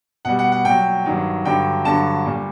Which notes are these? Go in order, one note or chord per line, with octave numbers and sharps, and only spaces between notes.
B2 G3 F#5
F#5
F#5
A#2 F#3 G5
G2 D#3 F#3
G2 D3 F#3 G5
G2 D3 F#3 A5
A#2 G3